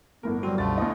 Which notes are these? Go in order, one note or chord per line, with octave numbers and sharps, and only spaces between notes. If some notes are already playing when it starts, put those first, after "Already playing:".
G1 A2 B3 A#4
F#3 G3 C4 F#4
C2 F#2 B2 D3 F3 A3 A6
D2 E4 D#5